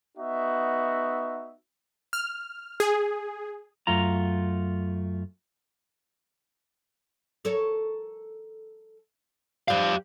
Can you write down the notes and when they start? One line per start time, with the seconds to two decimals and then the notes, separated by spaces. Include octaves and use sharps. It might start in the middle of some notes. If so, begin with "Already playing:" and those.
0.18 B3 D#4 F#4 E5
2.13 F6
2.80 G#4
3.87 F#2 A3 F4 A#5
7.45 A4 A#4 C#5
9.68 F3 G3 G4 F5